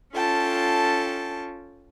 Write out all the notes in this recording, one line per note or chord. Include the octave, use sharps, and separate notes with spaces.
C#4 F4 A4 G5 A5